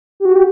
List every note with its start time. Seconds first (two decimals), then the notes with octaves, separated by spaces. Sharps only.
0.20 G4
0.25 F#4
0.36 G4